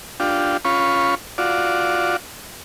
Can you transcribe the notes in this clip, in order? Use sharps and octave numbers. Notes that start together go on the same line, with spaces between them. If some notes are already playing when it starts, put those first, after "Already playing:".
D4 F4 G4
C#4 F4 B5 C#6
F4 F#4 D5